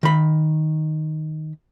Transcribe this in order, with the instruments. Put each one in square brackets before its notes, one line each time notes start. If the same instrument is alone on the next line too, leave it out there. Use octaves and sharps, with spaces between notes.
[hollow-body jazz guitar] D#3 B5